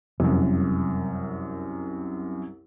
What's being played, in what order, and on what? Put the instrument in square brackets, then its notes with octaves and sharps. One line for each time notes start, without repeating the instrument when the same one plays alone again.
[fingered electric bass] F1 [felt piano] C2 F#2